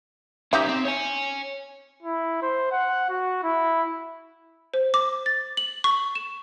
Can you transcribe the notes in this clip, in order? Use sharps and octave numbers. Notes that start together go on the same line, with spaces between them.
G3 C#4 D#4 G4 E5
C4
C#5 G#5
E4
C5
F#5
F#4
E4
C5
D6
A6
F#7
C#6
E7